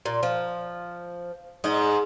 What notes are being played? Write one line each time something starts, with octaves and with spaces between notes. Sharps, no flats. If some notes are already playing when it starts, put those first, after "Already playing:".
A#2
F3
G#2 D#5